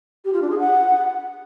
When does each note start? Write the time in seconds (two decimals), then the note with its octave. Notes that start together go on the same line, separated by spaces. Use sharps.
0.25 G4
0.33 F4
0.42 D4
0.50 G#4
0.59 F#5